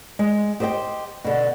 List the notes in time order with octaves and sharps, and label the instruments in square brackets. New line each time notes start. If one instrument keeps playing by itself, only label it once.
[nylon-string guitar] G#3
G4 C5 D#5 E5 G5
B2 D3